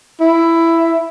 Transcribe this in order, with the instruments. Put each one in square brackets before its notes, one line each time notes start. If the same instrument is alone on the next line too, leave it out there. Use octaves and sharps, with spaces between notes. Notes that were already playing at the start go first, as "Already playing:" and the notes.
[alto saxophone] E4